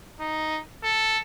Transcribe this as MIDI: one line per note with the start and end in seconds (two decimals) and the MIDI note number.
0.20 0.60 63
0.83 1.18 69